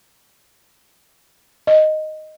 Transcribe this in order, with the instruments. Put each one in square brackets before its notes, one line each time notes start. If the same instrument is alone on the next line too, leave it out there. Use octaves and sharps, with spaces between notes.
[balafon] D#5